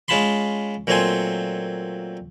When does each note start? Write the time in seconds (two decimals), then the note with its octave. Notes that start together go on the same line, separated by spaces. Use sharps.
0.08 G#3 C#4 F4 A5 B5 C6
0.87 A#2 F#3 A3 C4 G#5 C6